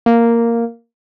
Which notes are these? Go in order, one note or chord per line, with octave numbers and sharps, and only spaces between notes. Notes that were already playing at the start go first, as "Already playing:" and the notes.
A#3